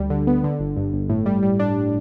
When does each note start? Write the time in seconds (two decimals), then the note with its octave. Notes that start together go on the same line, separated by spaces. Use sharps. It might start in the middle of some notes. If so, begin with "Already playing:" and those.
Already playing: D2 G3
0.10 D3
0.27 B3
0.44 D3
0.60 G1
0.77 G2
0.93 G1
1.09 A2
1.26 G3
1.42 G3
1.60 D4